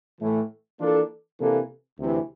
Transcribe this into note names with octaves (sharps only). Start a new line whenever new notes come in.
A2 E3 A3
E3 A#3 D4 F4 A4
C3 E3 A#3 D4 A4
D2 C3 E3